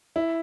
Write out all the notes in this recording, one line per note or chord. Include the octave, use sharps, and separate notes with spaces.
E4